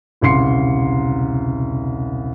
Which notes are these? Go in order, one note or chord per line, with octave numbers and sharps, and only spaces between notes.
E1 C2 C#3 C6 C7 C#7